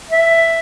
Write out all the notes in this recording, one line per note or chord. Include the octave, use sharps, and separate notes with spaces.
E5